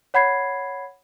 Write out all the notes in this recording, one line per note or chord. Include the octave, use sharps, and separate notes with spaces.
C#5 F#5 B5 G#6 C7